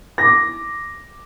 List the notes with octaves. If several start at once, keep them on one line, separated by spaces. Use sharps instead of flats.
D6 A#6